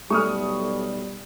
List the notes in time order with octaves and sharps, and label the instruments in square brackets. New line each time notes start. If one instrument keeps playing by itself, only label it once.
[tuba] B1 [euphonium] G3 [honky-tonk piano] A3 [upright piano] C#6 D#6 F6